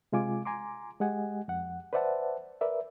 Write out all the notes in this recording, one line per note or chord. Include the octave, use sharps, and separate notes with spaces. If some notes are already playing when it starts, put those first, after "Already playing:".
C3 G#3 F4 G#5 D6
G#5 A#5 C6 D6
G#3 G4 D#5 F#5 G#5
F2 F#5
B4 C5 D5 E5 F#5 A5
A#4 B4 D5 E5